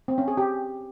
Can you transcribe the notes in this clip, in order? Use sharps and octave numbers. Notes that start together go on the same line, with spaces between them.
C4
C#4
G#4
G4